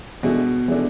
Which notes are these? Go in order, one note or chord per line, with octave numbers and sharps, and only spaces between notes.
B2 E3 G#3 D4 A4
E3 G#3 D4 A4